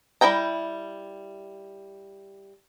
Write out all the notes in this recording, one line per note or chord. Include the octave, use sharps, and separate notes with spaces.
G3 E4 A4 G5 A#5